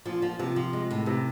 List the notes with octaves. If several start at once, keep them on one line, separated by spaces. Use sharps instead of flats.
A#2 F3
F3
C3 F3
F3
G#3
A2
A2 C3